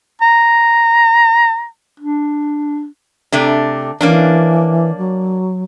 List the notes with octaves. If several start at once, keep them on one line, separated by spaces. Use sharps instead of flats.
A#5
D4
C3 A3 D4
E3 A#3 C#4 D4
F#3